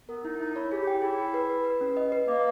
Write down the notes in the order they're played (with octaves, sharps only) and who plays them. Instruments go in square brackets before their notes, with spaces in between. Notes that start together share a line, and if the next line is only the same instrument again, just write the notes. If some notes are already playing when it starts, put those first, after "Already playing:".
[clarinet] B3 [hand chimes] A#4
[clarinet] D#4 [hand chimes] E4
[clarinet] D#4 [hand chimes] E4
[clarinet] E4 [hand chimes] C#5
[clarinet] G4 [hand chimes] G#4
[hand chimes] G5
[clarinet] E4 [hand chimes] G#4
[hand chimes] G#4
B4
B4
B4
C#4
D#5
B4
[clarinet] A#3 [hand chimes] D#5